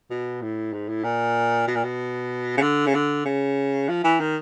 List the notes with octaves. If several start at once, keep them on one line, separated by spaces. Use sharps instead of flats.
B2
A2
G#2
A2
A#2
B2
A#2
B2
C#3
D3
C#3
D3
C#3
F3
E3
D#3